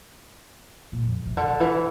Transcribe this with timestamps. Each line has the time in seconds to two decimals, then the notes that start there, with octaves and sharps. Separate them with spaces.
0.92 A#2
1.03 F2
1.26 C3
1.37 D3
1.60 E3